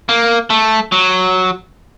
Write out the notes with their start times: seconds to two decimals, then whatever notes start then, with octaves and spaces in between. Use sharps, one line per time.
0.09 A#3
0.50 A3
0.92 F#3